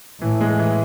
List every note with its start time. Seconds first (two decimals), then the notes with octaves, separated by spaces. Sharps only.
0.21 A2 E3
0.40 G#3
0.59 E3